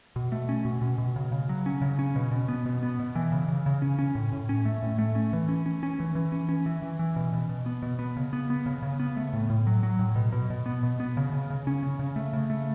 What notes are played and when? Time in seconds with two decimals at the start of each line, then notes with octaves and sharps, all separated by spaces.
0.16 B2
0.32 A3
0.49 C#4
0.65 B2
0.82 B2
0.98 B2
1.16 C#3
1.32 C#3
1.49 F#3
1.66 C#4
1.82 C#3
1.99 C#4
2.16 B2
2.32 B2
2.49 B3
2.66 B2
2.83 B3
2.99 B2
3.15 E3
3.32 C#3
3.48 C#3
3.66 C#3
3.82 C#4
3.99 C#4
4.15 A2
4.33 A2
4.49 C#4
4.65 A3
4.83 A2
4.98 A3
5.15 C#4
5.33 E3
5.49 C#4
5.66 C#4
5.83 C#4
6.00 E3
6.15 E3
6.32 C#4
6.49 C#4
6.66 E3
6.82 E3
6.99 E3
7.16 B2
7.33 B2
7.49 B2
7.66 B3
7.82 B2
7.99 B3
8.17 C#3
8.33 B3
8.50 B3
8.66 C#3
8.82 C#3
9.00 B3
9.17 A3
9.33 A2
9.50 A2
9.67 F#3
9.83 F#3
9.99 A2
10.16 B2
10.32 B2
10.50 B2
10.66 B3
10.83 B2
11.00 B3
11.17 C#3
11.33 C#3
11.50 C#3
11.67 C#4
11.83 C#3
11.99 C#3
12.16 A3
12.33 C#3
12.50 A3